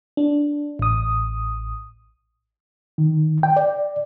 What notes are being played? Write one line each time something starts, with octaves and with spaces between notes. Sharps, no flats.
D4
A1 D#6
D#3
G5
D5